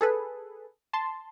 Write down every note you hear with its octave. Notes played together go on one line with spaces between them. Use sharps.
G#4 A4 B4
A5 C6